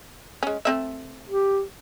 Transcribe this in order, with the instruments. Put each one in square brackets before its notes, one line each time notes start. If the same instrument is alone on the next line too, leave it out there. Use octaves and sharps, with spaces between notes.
[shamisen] G#3 C#4
A3 C4 E5
[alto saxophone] G4